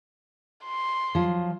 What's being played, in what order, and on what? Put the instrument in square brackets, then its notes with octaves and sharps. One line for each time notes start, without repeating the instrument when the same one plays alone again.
[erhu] C6
[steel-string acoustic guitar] F3 F#3